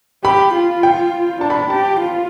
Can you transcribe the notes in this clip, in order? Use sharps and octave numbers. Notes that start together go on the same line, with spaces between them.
G4 B5
F4
G5
D4 A5
B5
G4 A5
F4